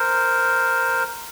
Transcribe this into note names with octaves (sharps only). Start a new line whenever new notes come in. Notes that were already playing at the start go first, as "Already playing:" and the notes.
Already playing: A#4 C5